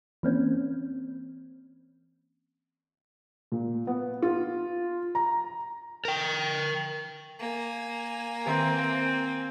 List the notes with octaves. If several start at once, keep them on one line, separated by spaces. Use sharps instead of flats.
E3 A#3 C4 C#4
A#2
B3
F4
A#5
A#4 G5
A#3 G#5
D#3 C4 E5 C6